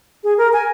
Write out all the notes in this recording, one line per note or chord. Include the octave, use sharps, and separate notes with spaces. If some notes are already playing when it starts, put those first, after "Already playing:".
G#4
A#4
G#5